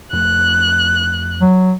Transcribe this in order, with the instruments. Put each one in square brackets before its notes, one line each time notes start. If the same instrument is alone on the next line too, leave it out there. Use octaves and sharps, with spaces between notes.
[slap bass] F2 A3 [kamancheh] F#6
[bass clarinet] F#3